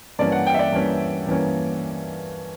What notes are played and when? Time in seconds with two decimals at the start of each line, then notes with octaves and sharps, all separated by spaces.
0.19 G2 E3 A#3 C#4 D5
0.32 F#5
0.47 G5
0.54 E5
0.59 D5
0.72 G2 E3 A#3 C#4
1.27 G2 E3 A#3 C#4